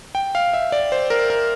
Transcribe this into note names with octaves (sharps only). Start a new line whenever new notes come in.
G5
F5
E5
D5
C5
A#4
A#4